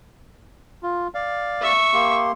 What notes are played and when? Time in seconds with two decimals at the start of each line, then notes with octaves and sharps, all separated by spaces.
0.83 F4
1.15 D5 F5
1.62 E5 C#6
1.93 A#3 G4 C6